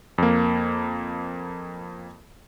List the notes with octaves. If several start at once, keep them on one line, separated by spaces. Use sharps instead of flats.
F2 A#3